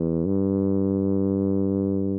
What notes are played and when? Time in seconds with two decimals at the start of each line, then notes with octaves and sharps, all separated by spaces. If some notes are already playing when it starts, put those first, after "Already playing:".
Already playing: E2
0.26 G2